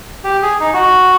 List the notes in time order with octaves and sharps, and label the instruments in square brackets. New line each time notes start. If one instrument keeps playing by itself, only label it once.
[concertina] G4
G#4
D#4
F#4